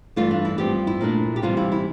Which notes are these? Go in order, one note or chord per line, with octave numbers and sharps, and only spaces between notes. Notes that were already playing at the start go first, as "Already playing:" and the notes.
G2 E3 A3 F4
D4
E4
G2 F3 C4 G4
E4
A#2 A3 D4
G4
C3 E3 G3 F4
E4
E4